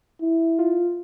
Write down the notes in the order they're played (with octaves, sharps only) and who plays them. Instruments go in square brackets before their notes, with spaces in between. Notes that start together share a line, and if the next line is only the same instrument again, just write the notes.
[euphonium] E4
[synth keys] F4